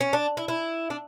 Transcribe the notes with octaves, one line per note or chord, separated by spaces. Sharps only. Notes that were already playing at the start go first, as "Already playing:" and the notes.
C#4
D4
E4
E4
D4